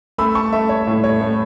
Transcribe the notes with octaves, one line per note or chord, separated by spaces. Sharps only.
A3 B5 E6
A5 C#6
A3 E5
C#5
A2
C#5
A3